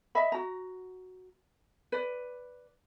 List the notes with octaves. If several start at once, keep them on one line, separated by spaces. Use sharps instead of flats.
D#5 E5 B5
F#4 A#5
B4 D5